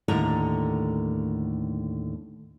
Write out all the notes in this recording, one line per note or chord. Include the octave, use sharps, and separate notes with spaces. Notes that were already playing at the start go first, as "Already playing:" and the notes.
D#2 A2 D3 A#4 F#5 A#5